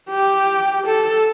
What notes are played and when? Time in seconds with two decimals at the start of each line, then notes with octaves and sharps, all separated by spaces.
0.10 G4
0.86 A4